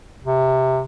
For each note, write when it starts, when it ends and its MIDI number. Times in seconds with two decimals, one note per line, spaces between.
0.23 0.82 48